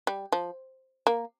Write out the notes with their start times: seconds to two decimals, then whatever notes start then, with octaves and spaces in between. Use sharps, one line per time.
0.07 G3
0.32 F3
1.07 A#3